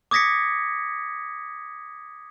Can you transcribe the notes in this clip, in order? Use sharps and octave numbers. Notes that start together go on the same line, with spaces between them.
D6 D#6 G#6 A#6 B6 C#7